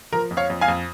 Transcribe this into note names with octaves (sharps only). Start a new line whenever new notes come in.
F3 A#4
F2
C#5 F5
F2
F5 G#5
F2